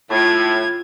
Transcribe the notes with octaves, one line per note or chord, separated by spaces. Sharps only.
A2 F4 G#6